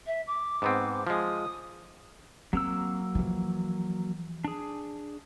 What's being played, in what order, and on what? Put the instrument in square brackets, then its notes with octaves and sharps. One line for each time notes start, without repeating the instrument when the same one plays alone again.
[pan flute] E5
D6
[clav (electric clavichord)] G#2 B3 C4
[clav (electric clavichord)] F3 G#3 [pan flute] D#6
[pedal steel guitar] F#3 A#3 E6 [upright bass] C4
[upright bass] E3 F3
[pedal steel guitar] D4 G#4